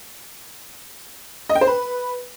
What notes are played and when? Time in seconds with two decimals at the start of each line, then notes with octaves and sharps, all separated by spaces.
1.49 D#5
1.55 G5
1.61 C5
1.67 B4